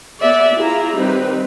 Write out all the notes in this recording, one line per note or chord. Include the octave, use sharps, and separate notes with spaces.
B3 G#4 D5 E5
E4 F4 G#4 A#5
D#3 G3 C4 D#4 B4